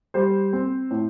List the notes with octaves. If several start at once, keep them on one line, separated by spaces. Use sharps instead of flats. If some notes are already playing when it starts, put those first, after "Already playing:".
G3 C5
C4
A2